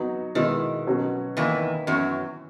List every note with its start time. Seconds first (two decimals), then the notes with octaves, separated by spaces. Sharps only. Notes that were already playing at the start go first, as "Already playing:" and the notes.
Already playing: F#3 B3 D#4 F#4
0.35 B2 D#3 G#3 B3 E4
0.87 B2 F#3 C#4 F#4
1.37 E2 D#3 E3 A#3 D#4
1.87 F#2 E3 F#3 B3 E4